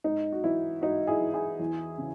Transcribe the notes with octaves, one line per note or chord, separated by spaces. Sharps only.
G#2 D#4
F#4
E3 E4
G#2 D#4 F#4
E4 G#4
E3
E4 G#4
E2
C#3